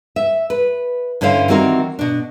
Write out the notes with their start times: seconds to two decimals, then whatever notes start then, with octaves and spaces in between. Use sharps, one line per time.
0.16 E5
0.50 B4
1.21 G2 D3 C#4 E4 C5 F5
1.48 D#3 E3 G3 C4 F#4 A#4
1.99 B2 D4